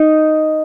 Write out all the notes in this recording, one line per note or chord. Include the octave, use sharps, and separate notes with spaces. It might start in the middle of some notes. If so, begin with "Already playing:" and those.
Already playing: D#4